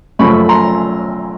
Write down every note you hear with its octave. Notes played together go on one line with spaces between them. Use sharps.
F#2 C#3 F3 A3 B5 C#6
A#5 C6